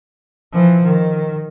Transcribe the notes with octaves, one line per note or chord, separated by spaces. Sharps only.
E3 F3
D#3